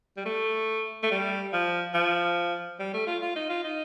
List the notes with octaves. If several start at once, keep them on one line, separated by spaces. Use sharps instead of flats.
G3
A3
A3
G3
F3
F3
G3
A3
F4
F4
D#4
F4
D#4